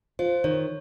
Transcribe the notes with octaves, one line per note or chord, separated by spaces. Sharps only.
F4 C5
D#3 C#5